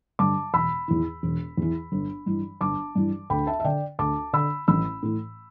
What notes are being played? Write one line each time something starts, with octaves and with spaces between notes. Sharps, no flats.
G2 D3 A5 D6
E1 B5 E6
E2 E3
E1
E2 E3
G1
G2 E3
G1 A5 D6
G2 E3
D2 G5 B5
E5 A5
E5
D3 D5 G5
D2 A5 D6
D3 B5 E6
A1 B5 E6
A2 E3